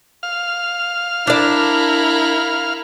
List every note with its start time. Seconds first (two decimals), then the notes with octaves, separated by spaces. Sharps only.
0.23 F5 F6
1.27 D4 E4 A#4 D5